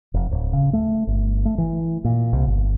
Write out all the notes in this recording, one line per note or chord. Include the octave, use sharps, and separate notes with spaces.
F1
D1
C#3
A3
G1
A3
E3
A#2
C2
G1